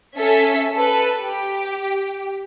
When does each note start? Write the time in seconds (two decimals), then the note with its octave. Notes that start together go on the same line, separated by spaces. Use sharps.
0.16 C#4 A4 E5 B6
0.75 A4 B4
1.18 G4